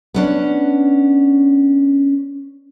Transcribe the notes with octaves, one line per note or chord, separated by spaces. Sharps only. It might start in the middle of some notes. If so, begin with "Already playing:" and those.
B3 C#4 D4